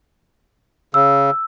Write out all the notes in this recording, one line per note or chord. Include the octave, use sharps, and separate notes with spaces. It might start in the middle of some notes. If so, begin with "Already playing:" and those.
C#3 E6